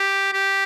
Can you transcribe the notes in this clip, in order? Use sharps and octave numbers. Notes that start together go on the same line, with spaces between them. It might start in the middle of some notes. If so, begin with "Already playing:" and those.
Already playing: G4
G4